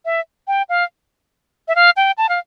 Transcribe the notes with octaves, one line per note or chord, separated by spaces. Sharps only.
E5
G5
F5
E5
F5
G5
A5
F5